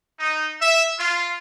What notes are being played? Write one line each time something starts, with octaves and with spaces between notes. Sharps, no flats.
D#4
E5
F4